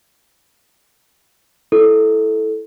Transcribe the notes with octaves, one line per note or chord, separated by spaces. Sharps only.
E4 A4